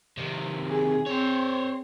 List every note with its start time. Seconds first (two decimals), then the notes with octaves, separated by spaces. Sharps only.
0.17 C3 D#3
0.69 G#4
1.06 C4 C5 C#5